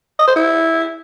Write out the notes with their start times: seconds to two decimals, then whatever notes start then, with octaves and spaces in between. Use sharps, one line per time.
0.19 D#5
0.28 C5
0.36 E4